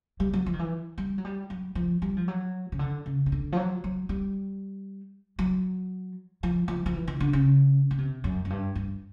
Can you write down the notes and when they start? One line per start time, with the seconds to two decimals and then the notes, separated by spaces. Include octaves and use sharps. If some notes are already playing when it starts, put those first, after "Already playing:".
0.20 G3
0.33 F#3
0.46 F3
0.53 D#3
0.59 E3
0.98 G3
1.18 F#3
1.25 G3
1.50 F#3
1.75 F3
2.02 G3
2.17 F3
2.28 F#3
2.72 C#3
2.79 D3
3.06 C#3
3.26 C#3
3.32 D3
3.52 F3
3.57 F#3
3.84 F#3
4.09 G3
5.39 F#3
6.43 F3
6.68 F3
6.86 F3
6.94 E3
7.07 D#3
7.20 D3
7.33 C#3
7.91 C#3
7.98 C3
8.24 F#2
8.45 F#2
8.50 G2
8.75 G2